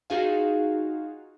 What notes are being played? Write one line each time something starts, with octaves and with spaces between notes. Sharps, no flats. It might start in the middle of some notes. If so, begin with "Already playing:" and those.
D#4 F4 F#4 G#4 F5